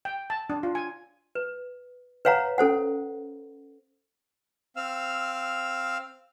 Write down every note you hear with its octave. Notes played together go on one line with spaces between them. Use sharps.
G5
A5
D4
F4
G#5
B4
B4 C#5 F5 F#5 A#5
C#4 A4 C5 F#5
C4 F5 E6 F6